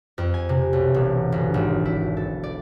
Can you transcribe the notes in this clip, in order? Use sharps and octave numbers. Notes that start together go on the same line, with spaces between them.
F2
G#5
C3
B1
E1
G1
G#1
E4
A4
D5